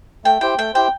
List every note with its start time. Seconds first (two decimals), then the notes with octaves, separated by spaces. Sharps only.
0.25 A3 G5
0.41 E4 G4 C5 G5
0.58 A3 G5
0.74 E4 G4 C5 G5